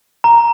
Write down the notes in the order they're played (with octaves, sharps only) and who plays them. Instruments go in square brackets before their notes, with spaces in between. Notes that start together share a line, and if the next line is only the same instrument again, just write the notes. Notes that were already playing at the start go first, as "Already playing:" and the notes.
[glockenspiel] A#5